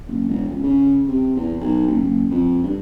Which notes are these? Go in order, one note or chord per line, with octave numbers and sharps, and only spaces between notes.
F#1
E1
C#2
C#3
C3
E2
B1
F#1
F#1
F2
G2